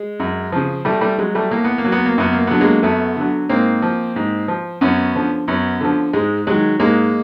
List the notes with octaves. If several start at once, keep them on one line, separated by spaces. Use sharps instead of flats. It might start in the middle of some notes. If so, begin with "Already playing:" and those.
Already playing: G#3
F#2
C#3 F3
A2 G3 A3
G3 A3
F#3 G#3
G3 A3
A2 A#3
B3
A#3
F#3
B3
A#3
F#2 B3
A#3
D3 F#3 B3
G#3 A#3
F#2 A3 B3
D3 F#3
G#2 A#3 C4
F3
G#2
F3
F#2 B3 C#4
D3 F3
F#2 B3 C#4
D3 F3
G#2 G#3
D#3 F#3 G#3
G#2 G#3 A#3